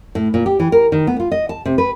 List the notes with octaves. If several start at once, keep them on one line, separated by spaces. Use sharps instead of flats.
A2
A#2
G4
E3
A#4
D#3
B3
F4
D#5
A5
C3
B4